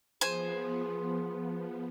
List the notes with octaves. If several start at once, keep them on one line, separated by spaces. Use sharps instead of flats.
F3 B3 G#4 C5 G#5